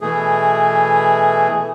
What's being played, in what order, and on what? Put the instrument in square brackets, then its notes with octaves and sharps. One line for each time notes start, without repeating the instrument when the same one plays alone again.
[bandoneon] B2 E3 A3 G#4